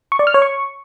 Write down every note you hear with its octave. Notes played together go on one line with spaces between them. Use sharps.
C#6
D5
F6
C#5
C#6